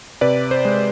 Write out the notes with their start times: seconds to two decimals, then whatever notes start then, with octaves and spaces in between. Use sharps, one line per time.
0.21 C3 B4 D5
0.51 C5
0.65 G#3